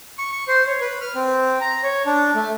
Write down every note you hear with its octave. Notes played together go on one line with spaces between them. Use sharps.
C#6
C#6
C5
C#5
B4
F6
C4
A#5
C#5
D4
A3